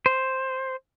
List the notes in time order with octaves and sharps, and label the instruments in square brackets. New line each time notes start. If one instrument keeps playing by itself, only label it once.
[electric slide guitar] C5